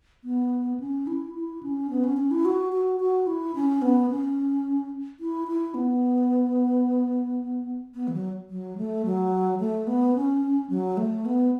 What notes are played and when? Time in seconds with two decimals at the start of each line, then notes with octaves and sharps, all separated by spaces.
0.24 B3
0.80 C#4
1.07 E4
1.35 E4
1.63 C#4
1.90 B3
2.04 C#4
2.17 C#4
2.31 E4
2.45 F#4
2.73 F#4
3.00 F#4
3.27 E4
3.56 C#4
3.82 B3
4.11 C#4
5.20 E4
5.48 E4
5.74 B3
7.95 B3
8.08 E3
8.14 F#3
8.50 F#3
8.78 A3
9.05 F#3
9.60 A3
9.87 B3
10.15 C#4
10.70 F#3
10.97 A3
11.25 B3